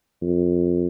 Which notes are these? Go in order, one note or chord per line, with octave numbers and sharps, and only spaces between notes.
F2